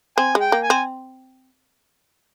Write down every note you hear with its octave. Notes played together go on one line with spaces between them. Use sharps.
C4 G#5
G#3
G5
A#3
G#5
C4